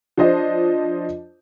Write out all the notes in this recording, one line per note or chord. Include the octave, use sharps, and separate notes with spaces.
F3 D4 C5 D#5